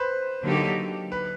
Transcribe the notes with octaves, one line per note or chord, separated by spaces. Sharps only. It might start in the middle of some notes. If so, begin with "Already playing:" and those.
Already playing: B4 C5
D3 F#3 A#3 D#4 G4
B4